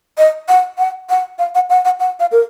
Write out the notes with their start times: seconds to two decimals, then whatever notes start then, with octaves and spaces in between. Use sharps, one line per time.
0.18 D#5
0.48 F#5
0.78 F#5
1.10 F#5
1.39 F5
1.55 F#5
1.70 F#5
1.85 F#5
2.00 F#5
2.20 F5
2.32 A#4